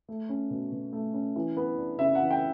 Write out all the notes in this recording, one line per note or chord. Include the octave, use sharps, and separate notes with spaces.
A3
C#4
B2
B2
A3
C#4
E3
B3
D4
C#3 E5
E3 F#5
G5